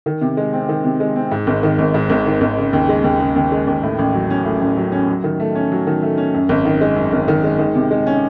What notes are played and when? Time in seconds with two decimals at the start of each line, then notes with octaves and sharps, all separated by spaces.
0.06 D#3
0.21 C3
0.37 G#3
0.53 C4
0.69 D#3
0.84 C3
1.00 G#3
1.16 C4
1.31 G#2
1.47 G#1
1.63 D#3
1.78 G#1
1.94 G#2
2.10 G#1
2.26 D#3
2.41 G#1
2.57 C#3
2.73 D#2
2.89 G#3
3.04 D#2
3.20 C#3
3.36 D#2
3.52 G#3
3.67 D#2
3.83 A2
3.99 A1
4.14 F#3
4.30 C#4
4.45 A2
4.62 A1
4.77 F#3
4.92 C#4
5.09 F#3
5.24 D#3
5.40 A3
5.55 C#4
5.72 F#3
5.87 D#3
6.03 A3
6.17 C#4
6.34 F#2
6.49 G#1
6.65 D#3
6.81 G#3
6.96 F#2
7.13 G#1
7.28 D#3
7.44 G#3
7.59 D#3
7.75 C3
7.91 G#3
8.07 C#4